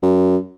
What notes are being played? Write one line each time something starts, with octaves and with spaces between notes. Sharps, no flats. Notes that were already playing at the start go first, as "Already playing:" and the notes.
F#2